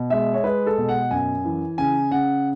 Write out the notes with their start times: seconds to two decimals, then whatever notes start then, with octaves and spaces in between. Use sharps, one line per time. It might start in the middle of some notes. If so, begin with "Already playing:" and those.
Already playing: B2
0.10 G#3 E5
0.34 C#5
0.44 G#3 B4
0.67 A4
0.78 B2
0.89 F#5
1.11 F#2 G#5
1.44 E3
1.78 C#3 G#5
2.11 C#3 F#5